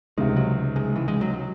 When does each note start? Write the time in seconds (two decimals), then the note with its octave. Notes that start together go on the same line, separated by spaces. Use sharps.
0.17 C#2 C3 D#3 G#3
0.37 F#3
0.76 G#3
0.96 E3
1.08 G#3
1.21 F#3
1.34 F#3